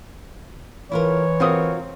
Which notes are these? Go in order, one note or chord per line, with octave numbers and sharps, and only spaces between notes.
E3 E4 F4 A#4 C#5
C4 F4 F#4 A#4 D#6